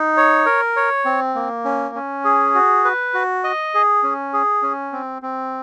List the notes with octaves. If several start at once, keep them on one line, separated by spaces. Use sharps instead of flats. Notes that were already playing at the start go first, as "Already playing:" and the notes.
Already playing: D#4
C#5
A#4
C#5
C4
A#3
C#4
C#4
G#4
F#4
B4
F#4
D#5
G#4
C#4
G#4
C#4
C4
C4